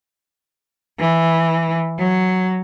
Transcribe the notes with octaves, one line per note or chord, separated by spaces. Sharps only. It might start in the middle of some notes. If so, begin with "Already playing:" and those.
E3
F#3